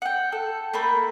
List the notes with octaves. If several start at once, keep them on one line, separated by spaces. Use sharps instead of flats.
F#5 G5
A4
A3 A#3 G5 B5